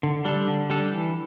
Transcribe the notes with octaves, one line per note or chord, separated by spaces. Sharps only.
D3
G3 D4 A4
D3
G3 D4 A4
E3